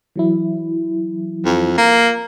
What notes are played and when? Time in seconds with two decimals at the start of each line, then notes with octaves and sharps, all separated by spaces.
0.16 E3 F#3 E4
1.45 F2
1.77 A#3